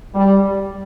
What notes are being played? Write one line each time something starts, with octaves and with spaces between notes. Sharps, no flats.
G3